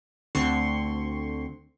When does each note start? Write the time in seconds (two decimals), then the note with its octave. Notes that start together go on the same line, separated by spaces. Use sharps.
0.35 D2 D3 C4 C6 C#6